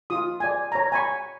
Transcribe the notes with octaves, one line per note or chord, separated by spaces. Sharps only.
F4 D#6
D5 G#5
C#5 A#5
G#5 B5 C#6